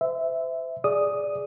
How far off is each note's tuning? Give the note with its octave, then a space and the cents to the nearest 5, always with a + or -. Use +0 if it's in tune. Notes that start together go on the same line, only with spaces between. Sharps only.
C5 -40 E5 -5
G#4 +0 D5 +0 D#6 +0